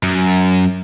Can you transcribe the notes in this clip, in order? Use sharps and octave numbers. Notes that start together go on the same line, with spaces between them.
F#2